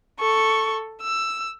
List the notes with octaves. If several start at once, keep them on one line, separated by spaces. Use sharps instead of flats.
A4 C#6
E6